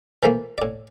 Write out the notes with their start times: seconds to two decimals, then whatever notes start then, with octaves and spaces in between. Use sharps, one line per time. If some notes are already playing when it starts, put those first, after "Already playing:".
0.23 E3 F3 A3 A#3
0.58 A2 D5